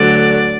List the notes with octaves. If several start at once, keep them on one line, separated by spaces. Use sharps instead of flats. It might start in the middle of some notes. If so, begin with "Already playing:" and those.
Already playing: D2 D3 F#3 D5